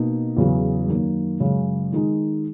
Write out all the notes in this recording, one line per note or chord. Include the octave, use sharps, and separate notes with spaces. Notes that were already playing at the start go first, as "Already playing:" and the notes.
Already playing: B2 A#3 D#4
E2 C#3 F#3
F#2 D#3 A#3
F#2 C#3 G#3
D#3 G#3 D#4